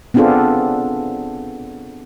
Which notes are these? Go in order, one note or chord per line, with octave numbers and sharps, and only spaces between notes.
B3 C4 D4 F4 G#4 A4